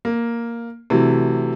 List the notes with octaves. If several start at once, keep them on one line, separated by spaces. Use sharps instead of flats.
A#3
C3 E3 F#3 A3